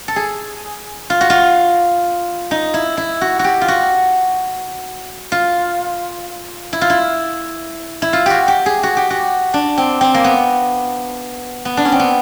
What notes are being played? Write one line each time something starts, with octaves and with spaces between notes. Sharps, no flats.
A4
G#4
F4
F#4
F4
D#4
E4
E4
F#4
F#4 G4
F4
F#4
F4
E4
F4
E4
E4
F4
F#4 G4
G4
G#4
F#4
G4
F#4
D4
C4
C4
A#3
B3
B3
D4
C#4
C4
B3